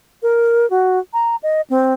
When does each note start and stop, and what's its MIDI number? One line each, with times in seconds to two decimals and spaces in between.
0.23 0.68 70
0.70 0.99 66
1.13 1.36 82
1.43 1.61 75
1.70 1.94 60